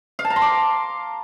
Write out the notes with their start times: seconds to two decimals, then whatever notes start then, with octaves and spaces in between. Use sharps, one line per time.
0.19 F5
0.25 A5
0.30 A#5
0.36 C6
0.42 D6